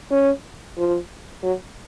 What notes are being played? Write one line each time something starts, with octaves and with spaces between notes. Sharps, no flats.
C#4
F3
F#3